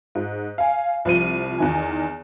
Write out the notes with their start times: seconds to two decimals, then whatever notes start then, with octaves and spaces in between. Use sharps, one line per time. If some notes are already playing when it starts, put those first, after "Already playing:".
0.15 G#2
0.58 F5 G#5
1.05 C2 F3 D#7
1.58 E2 D#3 G#5